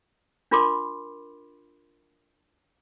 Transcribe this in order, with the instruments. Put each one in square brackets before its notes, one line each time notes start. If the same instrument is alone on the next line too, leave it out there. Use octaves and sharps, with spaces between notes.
[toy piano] D4 F4 A#4 B5 C6 D6